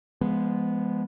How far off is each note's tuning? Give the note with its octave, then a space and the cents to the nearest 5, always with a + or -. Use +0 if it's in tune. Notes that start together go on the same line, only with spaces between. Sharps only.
F3 -25 G#3 +0 B3 +0